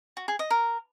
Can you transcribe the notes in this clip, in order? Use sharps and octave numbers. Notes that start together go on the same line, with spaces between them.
F#4
G#4
D#5
A#4